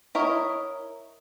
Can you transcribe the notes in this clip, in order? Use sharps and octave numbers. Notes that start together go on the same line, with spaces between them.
E4 A#4 C#5 D#5